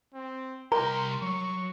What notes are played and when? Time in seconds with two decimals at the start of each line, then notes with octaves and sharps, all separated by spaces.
0.14 C4
0.72 C2 A#4 G5 A#5 C6
1.22 F#3 C#6